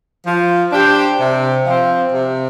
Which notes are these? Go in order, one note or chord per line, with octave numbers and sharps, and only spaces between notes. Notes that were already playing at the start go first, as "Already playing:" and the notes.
F3
D4 G4 C5
C3
F3 C4
C3